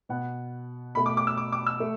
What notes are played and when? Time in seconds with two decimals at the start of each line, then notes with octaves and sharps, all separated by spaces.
0.09 B2 B3 F#5
0.95 B2 A3 B5
1.06 D6
1.17 D6
1.27 E6
1.37 D6
1.52 D6
1.67 E6
1.80 A3